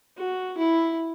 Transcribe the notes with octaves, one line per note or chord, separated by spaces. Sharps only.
F#4
E4